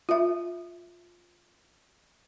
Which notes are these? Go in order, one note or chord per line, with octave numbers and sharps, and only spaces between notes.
F4 E5